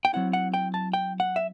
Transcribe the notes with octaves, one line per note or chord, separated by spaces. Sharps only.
G5
F#3 C4 E4 F#5
F#5
G5
A5
G5
F#5
E5